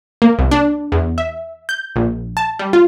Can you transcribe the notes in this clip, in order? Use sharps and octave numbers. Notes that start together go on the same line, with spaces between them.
A#3
C2
D4
E2
E5
G6
A#1
A5
G3
F4